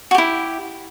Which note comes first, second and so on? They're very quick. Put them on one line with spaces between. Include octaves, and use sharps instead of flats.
F#4 G4 E4